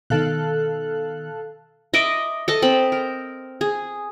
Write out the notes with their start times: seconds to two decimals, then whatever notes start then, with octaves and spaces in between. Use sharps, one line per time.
0.10 B2 D#3 A4 F5 F#6
1.94 D#5 E5 B5 D6
2.48 A4 D#5 A5
2.62 C4 B5
2.92 A#4
3.61 G#4